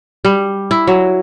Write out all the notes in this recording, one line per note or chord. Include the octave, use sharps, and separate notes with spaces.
G3
E4
F#3